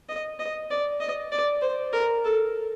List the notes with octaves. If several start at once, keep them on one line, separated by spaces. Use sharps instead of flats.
D#5
D#5
D5
D#5
D5
C5
A#4
A4